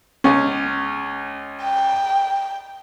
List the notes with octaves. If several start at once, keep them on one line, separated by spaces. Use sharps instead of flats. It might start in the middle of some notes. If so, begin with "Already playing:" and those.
C#2 C#4
G5